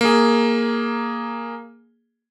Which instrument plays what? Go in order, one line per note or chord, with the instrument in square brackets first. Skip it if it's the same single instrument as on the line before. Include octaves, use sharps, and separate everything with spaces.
[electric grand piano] A#3 G#4